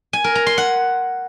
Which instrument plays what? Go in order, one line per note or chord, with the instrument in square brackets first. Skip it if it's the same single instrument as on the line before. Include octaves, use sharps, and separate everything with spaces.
[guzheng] G#5
A#4
A#5
C6
F#5